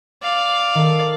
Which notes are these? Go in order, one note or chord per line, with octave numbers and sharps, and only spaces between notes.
D5 F5
D#3 A4